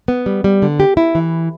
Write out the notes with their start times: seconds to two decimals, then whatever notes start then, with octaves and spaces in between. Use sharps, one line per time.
0.08 B3
0.26 G3
0.44 G3
0.62 D3
0.80 G4
0.97 E4
1.15 E3